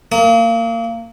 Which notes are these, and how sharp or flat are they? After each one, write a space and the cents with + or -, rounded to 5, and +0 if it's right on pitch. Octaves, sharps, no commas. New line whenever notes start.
A#3 -25 D#6 +40